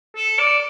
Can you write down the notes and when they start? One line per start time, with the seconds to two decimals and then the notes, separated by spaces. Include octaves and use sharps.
0.16 A4
0.39 D5